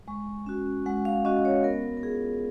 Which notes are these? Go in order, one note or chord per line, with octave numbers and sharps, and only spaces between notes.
G#3 C#6
C#4 F#4
G#3 F#5
F5
C#4 F#4 D#5
C#5
B3 A#4
A#4
F4 G#4